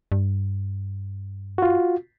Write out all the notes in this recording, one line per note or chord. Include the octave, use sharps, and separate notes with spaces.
G2
F4 F#4